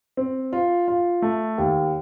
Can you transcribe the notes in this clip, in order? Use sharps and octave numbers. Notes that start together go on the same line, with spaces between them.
C4
F4
F4
A3
D#2